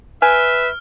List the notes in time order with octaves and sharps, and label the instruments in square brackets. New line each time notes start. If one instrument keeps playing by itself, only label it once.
[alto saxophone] B4 [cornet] E5 [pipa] G#5 [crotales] F6